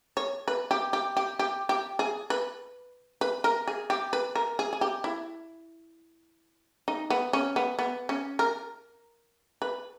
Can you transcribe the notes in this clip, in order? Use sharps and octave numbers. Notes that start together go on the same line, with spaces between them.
C#5
B4
G4
G4
G4
G4
G4
G#4
B4
B4
A#4
G#4
G4
B4
A#4
G#4
G#4
G4
E4
D#4
B3
C#4
B3
B3
C#4
A#4
B4